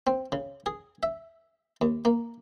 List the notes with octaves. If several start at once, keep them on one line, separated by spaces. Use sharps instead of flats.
C4
C#3
G#4
E5
D#2
A#3